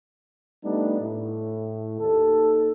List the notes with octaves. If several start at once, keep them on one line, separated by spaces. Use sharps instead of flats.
G3 A3 B3 D4 D#4
A2
D#2 A4